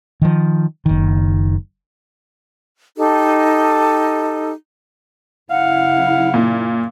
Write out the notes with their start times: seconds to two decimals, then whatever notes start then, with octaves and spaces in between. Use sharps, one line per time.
0.22 D#3 F3
0.86 F#1 D#3
2.97 D#4 G4 A4
5.50 F#2 C#3 E4 F5 F#5
6.34 A#2